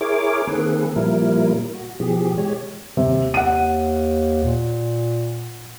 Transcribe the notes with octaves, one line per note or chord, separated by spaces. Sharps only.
E4 G#4 A#4 C#5 D6
D#3 A#3 C4 G#4 A4 B4
A#2 F3 G3 A#3 E4 A#4
F#4
B2 E3 F3 G4 G#4
G#3 G4 C#5
D#2 C3
F#5 D#7
A#2